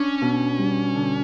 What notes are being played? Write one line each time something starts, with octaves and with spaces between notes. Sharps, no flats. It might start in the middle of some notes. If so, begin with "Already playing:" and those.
Already playing: C#4 D4
B2
G3
D3